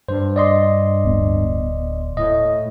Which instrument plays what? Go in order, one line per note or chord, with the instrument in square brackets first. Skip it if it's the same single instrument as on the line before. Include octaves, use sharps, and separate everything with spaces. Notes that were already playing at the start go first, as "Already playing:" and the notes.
[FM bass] G2 [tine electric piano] C5
[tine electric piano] D5 D#5 C6
[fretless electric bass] D1 B3
[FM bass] A2 [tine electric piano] D#5